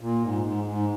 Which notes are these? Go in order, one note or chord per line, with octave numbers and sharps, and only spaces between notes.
A#2
G#2
G#2
G#2